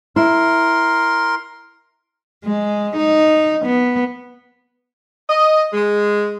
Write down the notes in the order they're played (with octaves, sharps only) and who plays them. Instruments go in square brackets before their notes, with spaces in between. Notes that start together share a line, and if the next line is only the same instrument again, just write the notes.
[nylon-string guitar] E4 [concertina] A#4 C6
[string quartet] G#3
D#4
B3
[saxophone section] D#5
G#3